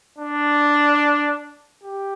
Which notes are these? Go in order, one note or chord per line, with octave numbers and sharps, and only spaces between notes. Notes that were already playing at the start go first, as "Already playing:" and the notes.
D4
G4